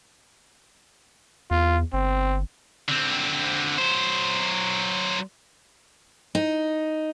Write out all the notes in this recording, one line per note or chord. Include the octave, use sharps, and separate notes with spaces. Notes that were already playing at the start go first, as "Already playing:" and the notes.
E2 F4
G1 C4
D3 C4
F#3 C5
D#4